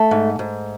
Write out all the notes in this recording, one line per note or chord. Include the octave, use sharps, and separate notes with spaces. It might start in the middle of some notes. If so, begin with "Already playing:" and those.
Already playing: A3
G#2
G#2